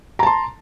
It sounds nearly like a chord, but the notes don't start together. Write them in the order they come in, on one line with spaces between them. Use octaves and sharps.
A#5 A5 C6